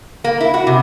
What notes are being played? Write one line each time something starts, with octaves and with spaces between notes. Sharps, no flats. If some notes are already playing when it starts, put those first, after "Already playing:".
A#3
E4
F#4
C3